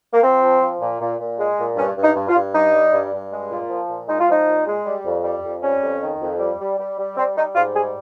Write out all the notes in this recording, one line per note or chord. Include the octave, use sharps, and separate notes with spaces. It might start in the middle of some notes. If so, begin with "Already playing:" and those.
A#3
F3 C4
F3
F3
A#2
A#2
A#2
G#3
A#2
G2 C#4
G2
D#4
G2
F4
G2
G3 D#4
G3
G2
G2
G#3
A#2
F3
A#2
G#3 D#4
F4
F3 D#4
A#2
G#3
G3
F2
G3
F2
G3 C#4
F2
D#3
F2
G3
G3
G3
G3
G3 C4
G3 D#4
G#2 F4
G3 G#4